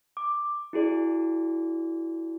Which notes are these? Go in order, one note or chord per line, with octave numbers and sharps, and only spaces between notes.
D6
E4 F#4 G#4 D5